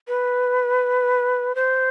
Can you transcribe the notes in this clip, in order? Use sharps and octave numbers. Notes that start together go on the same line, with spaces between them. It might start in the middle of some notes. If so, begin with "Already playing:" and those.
B4
C5